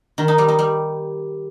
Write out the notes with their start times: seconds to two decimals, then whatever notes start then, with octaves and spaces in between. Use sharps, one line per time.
0.18 D#3
0.28 D#4
0.38 G3
0.48 D#4
0.59 G3